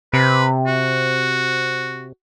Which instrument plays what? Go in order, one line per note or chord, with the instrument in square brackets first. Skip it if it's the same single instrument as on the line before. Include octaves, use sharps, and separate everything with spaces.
[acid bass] C3 [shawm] B4
[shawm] F#4